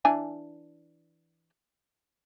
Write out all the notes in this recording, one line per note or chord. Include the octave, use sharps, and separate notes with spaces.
E3 D4 G#5